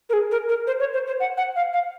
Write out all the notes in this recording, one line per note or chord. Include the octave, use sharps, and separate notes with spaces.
A#4
G#4
A#4
A#4
C5
C#5
C5
C5
F#5
F#5
F5
F5